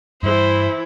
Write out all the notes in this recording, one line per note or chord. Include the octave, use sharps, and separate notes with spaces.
G2 E3 G3 E4 C5